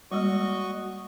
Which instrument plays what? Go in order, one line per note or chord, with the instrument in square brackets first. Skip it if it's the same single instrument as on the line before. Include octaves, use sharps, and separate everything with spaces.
[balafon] G3 G#3 A#3 [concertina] F#4 D#5 C#6